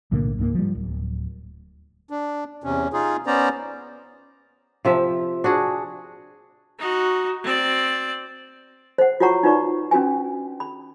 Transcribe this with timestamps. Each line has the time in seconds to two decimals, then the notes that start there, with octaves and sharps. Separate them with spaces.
0.12 B1 A2 D3 A#3
0.39 C#2 G#2 A3 A#3
0.55 F3 G3
0.75 D1
2.10 D4
2.64 E2 C3 C#4
2.93 D#4 F4 G#4
3.26 B3 C#4 C5 D5 A#5
4.85 C3 F3 E5
5.44 D4 F#4 G#4
6.79 D#4 F#4
7.44 C4 D5
8.98 C5 F#5
9.20 F4 F#4 C#5 F#5 A#5 C#6
9.43 D#4 F4 B4 D5 C#6
9.91 C#4 D4 F#4 B4 G#5
10.60 B5